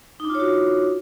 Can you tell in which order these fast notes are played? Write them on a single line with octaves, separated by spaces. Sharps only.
D#4 D4 F4 C#5 F#4